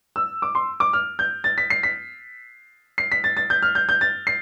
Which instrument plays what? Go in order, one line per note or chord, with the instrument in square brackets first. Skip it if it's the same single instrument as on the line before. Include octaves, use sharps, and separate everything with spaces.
[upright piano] E6
D6
C6
D6
F6
G6
A6
B6
C7
B6
C7
B6
A6
A6
G6
F6
G6
G6
A6
C7